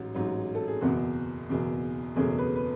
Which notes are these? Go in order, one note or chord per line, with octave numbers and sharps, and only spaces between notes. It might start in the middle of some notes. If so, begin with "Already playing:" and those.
Already playing: A1 G#2 F#3
A1 G#2 F#3
A4
G#4
F#1 E2 B2 F#4
F#1 E2 B2
F#1 E2 B2 A3 C#4 G#4
B4
B4